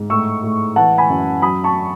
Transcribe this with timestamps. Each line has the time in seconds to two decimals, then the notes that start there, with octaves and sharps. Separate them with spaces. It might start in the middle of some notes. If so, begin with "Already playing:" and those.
Already playing: G#2
0.10 A2 C#6 E6
0.43 A2
0.76 E3 F#5 A5
0.98 G#5 B5
1.10 F#2
1.42 F#3 B5 D#6
1.64 A5 C#6